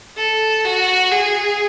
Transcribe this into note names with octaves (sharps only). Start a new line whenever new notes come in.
A4
F#4
G#4